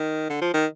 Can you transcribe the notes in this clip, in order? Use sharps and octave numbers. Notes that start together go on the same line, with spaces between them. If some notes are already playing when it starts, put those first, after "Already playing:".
Already playing: D#3
D3
F3
D#3